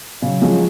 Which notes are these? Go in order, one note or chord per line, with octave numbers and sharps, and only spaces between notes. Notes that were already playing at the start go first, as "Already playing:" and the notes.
C#3 F#3
F3 G#3 C#4